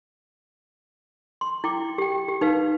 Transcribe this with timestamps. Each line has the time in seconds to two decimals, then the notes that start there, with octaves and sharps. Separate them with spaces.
1.41 C6
1.64 E4 G5 D6
1.98 G4 G5
2.28 G4
2.41 D#4 B4 F5